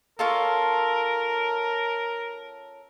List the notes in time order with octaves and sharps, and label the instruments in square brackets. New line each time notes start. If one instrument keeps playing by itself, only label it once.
[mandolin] C#4 F4 A4 [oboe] A#4